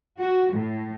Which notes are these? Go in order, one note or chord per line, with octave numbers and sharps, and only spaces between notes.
F#4
A2